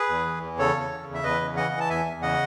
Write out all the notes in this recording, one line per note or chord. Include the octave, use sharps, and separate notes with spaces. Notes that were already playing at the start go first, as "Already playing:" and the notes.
Already playing: G#4 B4
E2
E3
E2
C#3 A4 C#5
E2
C#3
E2
E5
E2 B4 D#5
C#3
E3 D#5 F#5
E3
A5
E2 E5 G#5
E2
C#3 D#5 F#5